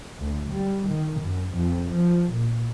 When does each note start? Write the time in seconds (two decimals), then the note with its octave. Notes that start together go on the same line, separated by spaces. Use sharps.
0.20 D2
0.52 G3
0.88 D#3
1.21 F#2
1.57 F2
1.95 F3
2.33 A#2